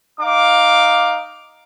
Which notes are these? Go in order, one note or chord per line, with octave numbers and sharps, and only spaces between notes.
D#4 F5 D6